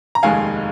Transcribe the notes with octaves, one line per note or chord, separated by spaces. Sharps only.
A#5
F1 D#2 D#3 G#3 F5 G#5